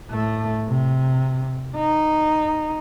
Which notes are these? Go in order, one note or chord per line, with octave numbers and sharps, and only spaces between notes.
A2 A3
C3
D#4